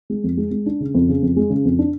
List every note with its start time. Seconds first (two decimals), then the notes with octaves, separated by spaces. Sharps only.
0.10 G#3
0.24 F2
0.37 G#3
0.51 G#3
0.66 D4
0.80 C#3
0.94 F2
1.09 C#3
1.22 F2
1.36 G#3
1.50 C#3
1.65 F2
1.79 D4